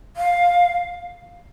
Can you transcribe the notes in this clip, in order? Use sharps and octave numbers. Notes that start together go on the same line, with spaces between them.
F5